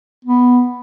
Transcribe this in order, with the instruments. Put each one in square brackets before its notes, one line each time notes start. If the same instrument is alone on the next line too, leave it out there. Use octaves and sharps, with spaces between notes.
[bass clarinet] B3